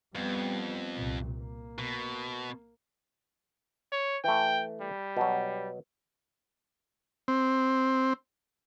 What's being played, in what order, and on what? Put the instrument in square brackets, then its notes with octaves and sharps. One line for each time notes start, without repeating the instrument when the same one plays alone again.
[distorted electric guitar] F2 [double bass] G3 B3
[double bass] C2 A#2
A#3
[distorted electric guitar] B2
[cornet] C#5
[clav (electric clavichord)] E3 A3 [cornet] G5
[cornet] G3
[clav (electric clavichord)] B2 F#3
[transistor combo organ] C4